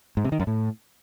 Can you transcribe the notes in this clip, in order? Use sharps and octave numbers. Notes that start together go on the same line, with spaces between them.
G#2
C3
D#3
F#2
A2